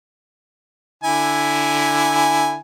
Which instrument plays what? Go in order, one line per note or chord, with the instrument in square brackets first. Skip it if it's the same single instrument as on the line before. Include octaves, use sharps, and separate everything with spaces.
[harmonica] D3 E4 G#5